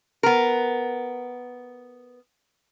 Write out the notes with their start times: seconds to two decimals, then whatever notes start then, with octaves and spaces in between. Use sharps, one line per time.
0.23 B3 A#4